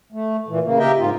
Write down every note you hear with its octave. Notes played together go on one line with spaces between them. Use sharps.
A3
A#2 E3
C#3 A#3
G4 A#4 D#5 E5 G5
G#2 F4